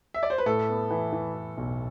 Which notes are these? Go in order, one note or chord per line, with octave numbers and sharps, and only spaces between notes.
E5
D5
C5
B4
A2 A4
B3
E3
E3
E3
B1